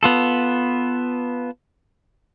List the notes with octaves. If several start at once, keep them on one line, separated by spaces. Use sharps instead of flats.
B3 F4 A4